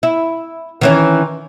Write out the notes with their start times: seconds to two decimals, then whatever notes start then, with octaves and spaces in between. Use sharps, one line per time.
0.03 E4
0.81 D#3 E3 C#4